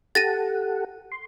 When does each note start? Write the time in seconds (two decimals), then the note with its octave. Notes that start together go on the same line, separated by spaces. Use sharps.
0.15 G4 A4 F#5 A6 A#6 D#7
1.12 C6